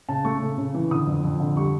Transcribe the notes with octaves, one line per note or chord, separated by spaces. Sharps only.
C#3 A5
A3 C#6
C#3
C#3
E3
D3 D#6
F2
F2
D3
G3 C#6